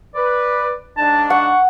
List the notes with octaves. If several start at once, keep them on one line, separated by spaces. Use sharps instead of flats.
B4 D5
G#2 D4 A5
F#5 C#6